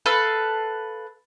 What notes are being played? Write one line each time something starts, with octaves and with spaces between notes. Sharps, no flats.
A4 B4 F5